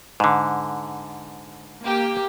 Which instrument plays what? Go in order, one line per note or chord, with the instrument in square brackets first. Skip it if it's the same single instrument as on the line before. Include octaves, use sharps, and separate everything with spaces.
[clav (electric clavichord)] G#2 D3
[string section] A#3 G4